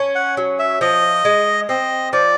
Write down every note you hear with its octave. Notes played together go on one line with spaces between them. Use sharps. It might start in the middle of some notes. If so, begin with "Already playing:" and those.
Already playing: C#4
F#5
F#3
E5
F3 D#5
G#3
C4 D#5
F3 D5